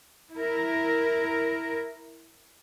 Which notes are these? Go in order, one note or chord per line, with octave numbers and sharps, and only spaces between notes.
E4 A#4